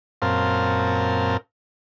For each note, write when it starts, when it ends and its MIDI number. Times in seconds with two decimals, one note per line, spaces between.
0.22 1.37 42
0.22 1.37 46
0.22 1.37 60
0.22 1.37 70
0.22 1.37 77
0.22 1.37 81